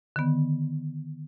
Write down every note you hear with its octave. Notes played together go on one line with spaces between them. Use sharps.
D3 D#3 B3